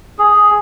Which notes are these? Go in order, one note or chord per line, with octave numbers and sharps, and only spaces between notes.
G#4